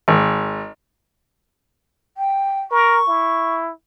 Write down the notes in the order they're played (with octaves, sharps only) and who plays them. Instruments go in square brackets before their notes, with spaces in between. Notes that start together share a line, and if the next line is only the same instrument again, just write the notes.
[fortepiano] G#1
[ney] G5
[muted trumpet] A#4 [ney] C#6
[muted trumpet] E4